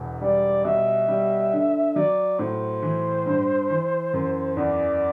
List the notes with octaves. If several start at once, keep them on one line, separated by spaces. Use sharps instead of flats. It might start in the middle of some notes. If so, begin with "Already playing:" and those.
Already playing: E1 E2
G3 D5
B2 E5
G3
D3
F#3 D5
A2 C5
E3
G2
E3
F#2
E2 D5